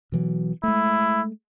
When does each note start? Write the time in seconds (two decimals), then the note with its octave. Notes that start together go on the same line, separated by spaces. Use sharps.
0.12 B2 E3 F#3
0.63 G#3 A3 E4